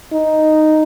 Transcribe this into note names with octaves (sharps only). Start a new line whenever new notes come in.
D#4